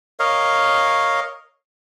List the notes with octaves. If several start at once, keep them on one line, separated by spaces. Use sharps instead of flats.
A#4 C#5 D#5 F5